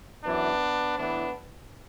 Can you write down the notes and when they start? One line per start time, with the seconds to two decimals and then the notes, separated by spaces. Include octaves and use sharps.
0.24 F#2 E3 B3 D4
0.98 A2 E3 B3 D4